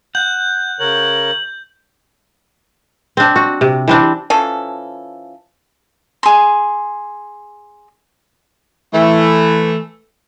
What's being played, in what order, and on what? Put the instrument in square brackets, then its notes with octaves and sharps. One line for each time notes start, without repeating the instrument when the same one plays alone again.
[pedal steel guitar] F#5 [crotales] G6
[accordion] C#3 A#4 C#5 [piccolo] F#7
[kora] C4 D4
F#4
C3
E3 C4 D4
[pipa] E3 F3 C#4 A4
[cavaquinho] G#4 C6
[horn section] E3 A3